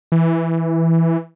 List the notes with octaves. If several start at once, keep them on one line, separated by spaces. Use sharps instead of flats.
E3